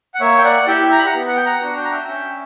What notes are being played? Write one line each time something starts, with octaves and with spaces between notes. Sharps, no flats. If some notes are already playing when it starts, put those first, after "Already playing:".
F#5
A#3 C#5 E5
G5
D5 F#5
E4 G4 E5 G5
A#5
B5
F#5 A#5
B3
F#5
G5
F#5 A#5
D4 F#4
G5
A#5
E5 G5
C#4 E5 G5